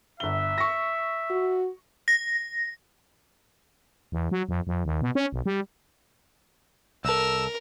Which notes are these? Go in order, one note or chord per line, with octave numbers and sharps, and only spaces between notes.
G1 E5 G7
C#6 A#6
F#4
A#6
E2
F#3
F2
F2
D#2
B2
C#4
B1
G3
C2 A4 A#4 E6